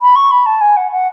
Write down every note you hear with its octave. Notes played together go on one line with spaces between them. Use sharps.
B5
C#6
B5
A5
G#5
F#5
F#5